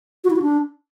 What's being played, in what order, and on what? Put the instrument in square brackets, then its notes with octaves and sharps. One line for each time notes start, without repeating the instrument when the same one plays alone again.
[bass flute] F#4
E4
F#4
D4